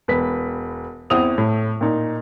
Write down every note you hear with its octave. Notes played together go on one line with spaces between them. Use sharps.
E1 B4 B6
E2 C4 E4 D#6 F7
A2
A#2 D#4